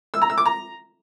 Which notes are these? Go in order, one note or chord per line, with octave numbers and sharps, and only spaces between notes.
E6
A#5
E6
D6
A#5